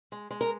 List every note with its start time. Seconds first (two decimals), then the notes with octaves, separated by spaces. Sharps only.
0.12 G#3
0.31 G#3
0.41 A#4